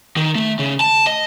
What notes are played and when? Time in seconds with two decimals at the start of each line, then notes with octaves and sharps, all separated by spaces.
0.16 D#3
0.35 A3
0.59 C#3
0.80 A5
1.07 D#5